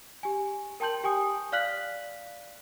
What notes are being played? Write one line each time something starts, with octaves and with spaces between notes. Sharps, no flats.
G4 G#5
A#4 G5 A5 C6 G6 F#7
G4 G5 G#5 D#6
D5 F5 F6 F#6 B6 F#7